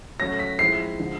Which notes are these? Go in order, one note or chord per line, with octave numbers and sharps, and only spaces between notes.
F#3 A3 C#4 A#6
B6
F3 G#3 C4 E4 C7
D3 F3 G#3